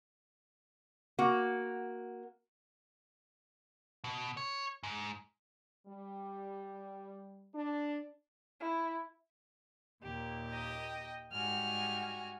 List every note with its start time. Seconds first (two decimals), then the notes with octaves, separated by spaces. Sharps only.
1.19 A#3 F#4
4.04 B2
4.37 C#5
4.83 G#2
5.87 G3
7.54 D4
8.60 E4
10.04 D#2 A#2 G4
10.48 D#5 G5
11.33 G#2 G3 F#4 G#5 F6